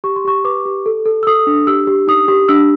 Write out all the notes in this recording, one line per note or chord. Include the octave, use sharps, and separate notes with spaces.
G4 C#6
C6
G4 C#6
B4 D6
G4
A4
A4
E6
A4 D#6
D4
G4 E6
G4
D#4 D#6
G4
D4 E6